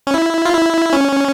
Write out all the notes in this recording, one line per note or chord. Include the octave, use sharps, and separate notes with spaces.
C#4
E4
F4
E4
C#4